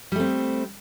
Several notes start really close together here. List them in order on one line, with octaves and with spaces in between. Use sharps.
G3 A3 C4